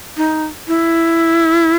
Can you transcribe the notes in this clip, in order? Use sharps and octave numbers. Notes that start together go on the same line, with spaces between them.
D#4
E4